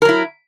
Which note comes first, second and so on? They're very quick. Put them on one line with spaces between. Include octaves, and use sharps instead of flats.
A#4 F#3 E4